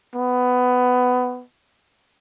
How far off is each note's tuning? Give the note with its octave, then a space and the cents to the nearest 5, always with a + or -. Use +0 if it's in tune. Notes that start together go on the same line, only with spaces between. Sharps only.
B3 +15